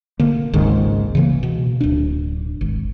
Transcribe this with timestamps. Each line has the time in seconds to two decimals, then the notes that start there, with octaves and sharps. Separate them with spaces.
0.19 D3 A#3
0.53 G#1 C#2 G#2 D#3
1.15 C#3 E3 A#3
1.43 B2
1.81 D1 D4
2.61 G#1